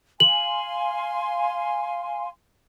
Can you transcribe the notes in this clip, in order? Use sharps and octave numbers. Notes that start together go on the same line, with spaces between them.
F5 G#5 C6 F#7